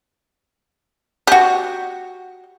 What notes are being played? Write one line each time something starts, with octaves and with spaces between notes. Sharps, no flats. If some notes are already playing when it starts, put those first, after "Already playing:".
F#4 G4